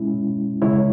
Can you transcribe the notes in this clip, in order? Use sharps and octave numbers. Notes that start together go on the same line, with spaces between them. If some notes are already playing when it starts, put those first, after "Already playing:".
Already playing: B2 G#3 C#4 E4
C#3 G#3 E4 C#5